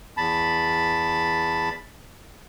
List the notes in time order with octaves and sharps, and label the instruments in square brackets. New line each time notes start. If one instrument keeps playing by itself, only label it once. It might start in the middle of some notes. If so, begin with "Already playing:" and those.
[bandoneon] E2 A5 B5